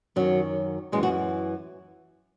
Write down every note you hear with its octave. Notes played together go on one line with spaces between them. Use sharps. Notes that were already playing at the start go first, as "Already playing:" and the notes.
F#2 D#3 F#3
F#2 E3 G#3
F#4